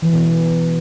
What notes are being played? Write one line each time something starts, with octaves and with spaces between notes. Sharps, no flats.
E3
B2
B2